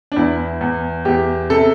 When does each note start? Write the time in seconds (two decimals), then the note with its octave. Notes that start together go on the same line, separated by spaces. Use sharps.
0.12 D4
0.16 E2 E4
0.61 E2
1.05 E2 G4
1.50 C3 A4